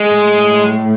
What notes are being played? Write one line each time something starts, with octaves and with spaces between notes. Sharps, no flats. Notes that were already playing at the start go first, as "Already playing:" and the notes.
Already playing: G#3
A2